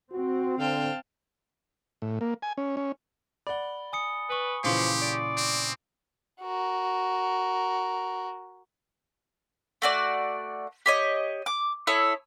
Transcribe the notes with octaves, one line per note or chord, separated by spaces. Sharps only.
C4 F#4
D3 F5 G5 A5
A2
A#3
G#5
C#4
C#4
D5 F#5 B5 G7
G#5 D#6 C#7
B4 G#5 C#6
A#2 C#3 E3 F3 G4 C6 D6 C7
D5
C4
F#4 A#4
A3 F#4 D5
G4 C#5 D#5
D6
E4 A4 C#5 D#6